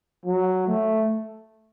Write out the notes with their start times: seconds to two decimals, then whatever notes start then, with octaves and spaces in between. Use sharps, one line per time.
0.26 F#3
0.67 A3